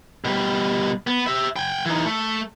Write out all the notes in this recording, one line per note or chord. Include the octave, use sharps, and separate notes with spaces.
B2 G3
B3
G4 E5
G5 G#5
E3 D#4
A3